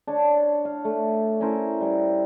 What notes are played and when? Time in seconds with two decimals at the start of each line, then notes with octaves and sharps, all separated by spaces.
0.07 D4 C#5 A5
0.65 F5
0.85 A3
1.41 C#4 E4 A#4 C5
1.81 G3 C5